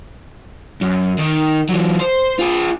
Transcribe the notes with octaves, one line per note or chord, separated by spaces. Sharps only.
F#2
D#3 D#4
E3 F#3
C5
F4 G#4